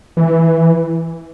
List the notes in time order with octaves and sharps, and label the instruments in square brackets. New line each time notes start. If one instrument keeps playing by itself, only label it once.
[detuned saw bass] E3